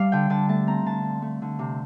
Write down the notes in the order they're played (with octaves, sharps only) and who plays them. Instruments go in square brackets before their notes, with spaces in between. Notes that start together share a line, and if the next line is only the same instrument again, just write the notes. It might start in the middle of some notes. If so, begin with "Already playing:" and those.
Already playing: [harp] G3 D5 F5 A5
D3 G5
D3 A5
A3 A5
C4 A#5
D3 A5
C4
A3
D3
C3